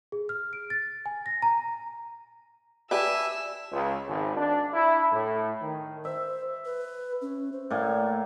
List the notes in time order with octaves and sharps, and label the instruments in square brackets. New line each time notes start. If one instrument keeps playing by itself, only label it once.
[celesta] G#4
F6
D7
A6
G#5
A#6
A#5
[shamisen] G4 B4 [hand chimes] D5 [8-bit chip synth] E5 G#5 A5 [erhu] E6
[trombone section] C#2
G#1
D4
E4
A2
D#3
[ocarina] C5 [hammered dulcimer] E5
[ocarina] B4
C#4
C5
[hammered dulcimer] A2 A#3 G#5 [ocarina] D5